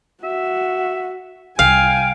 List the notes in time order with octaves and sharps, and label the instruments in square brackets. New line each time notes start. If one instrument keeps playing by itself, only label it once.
[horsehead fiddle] F#4 [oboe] E5
[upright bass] C2 [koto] F5 [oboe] G5 [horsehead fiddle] G#5